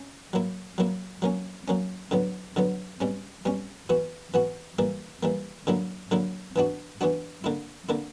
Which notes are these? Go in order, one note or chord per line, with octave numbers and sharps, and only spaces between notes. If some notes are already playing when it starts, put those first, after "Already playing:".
Already playing: C#4
F#3 A#3 E4
F#3 A#3 E4
F#3 A#3 C#4
F#3 A#3 C#4
D3 F#3 B3
D3 F#3 B3
B2 G3 C#4
B2 G3 C#4
E3 B3 F#4
E3 B3 F#4
E3 G3 A#3
E3 G3 A#3
D3 F#3 A#3 E4
D3 F#3 A#3 E4
E3 B3 D4 F#4
E3 B3 D4 F#4
D3 A#3 E4
D3 A#3 E4